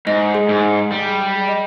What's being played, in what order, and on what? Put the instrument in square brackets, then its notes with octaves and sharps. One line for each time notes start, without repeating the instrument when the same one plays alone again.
[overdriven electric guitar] G#2 [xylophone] D#5
[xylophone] G#4
[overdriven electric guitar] G#2
[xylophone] G#4
[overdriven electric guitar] G3 [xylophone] G#4
[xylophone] G#4
D#5